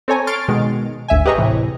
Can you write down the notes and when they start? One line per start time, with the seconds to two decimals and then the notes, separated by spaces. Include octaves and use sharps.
0.08 C4 A4 C#5 G#5 A#5
0.27 C6 C#6 F6 A6 D7
0.48 B2 D#3 G#3
1.08 G#1 D2 E5 G#5
1.26 G4 G#4 B4 D#5 A#5 C#6
1.38 A2 C3 E3